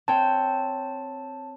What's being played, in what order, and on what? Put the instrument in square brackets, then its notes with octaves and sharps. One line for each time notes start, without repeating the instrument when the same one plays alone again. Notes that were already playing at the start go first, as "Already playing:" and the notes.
[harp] C4 C#5 G5 [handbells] A5